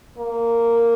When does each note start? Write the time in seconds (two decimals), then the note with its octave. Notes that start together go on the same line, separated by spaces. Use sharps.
0.18 A#3